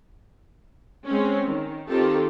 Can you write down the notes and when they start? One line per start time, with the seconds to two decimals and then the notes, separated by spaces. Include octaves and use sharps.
1.07 G#3 C4 C#4
1.46 D#3
1.87 D#3 C4 F4 G4 A4